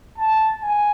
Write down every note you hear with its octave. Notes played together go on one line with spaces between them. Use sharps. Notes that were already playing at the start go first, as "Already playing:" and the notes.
A5
G#5